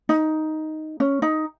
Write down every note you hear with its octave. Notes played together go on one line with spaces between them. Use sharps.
D#4
C#4
D#4